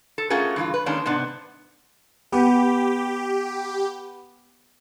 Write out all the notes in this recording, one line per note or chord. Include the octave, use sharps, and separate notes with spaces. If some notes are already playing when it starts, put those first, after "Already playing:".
A4
A3 C#4 F4 F#4 G#4 A#4
G2 E3 D#4 F4
B4
D#3 G#3 A#3 C#4 D4
G#2 C3 B3 D4
B3 G4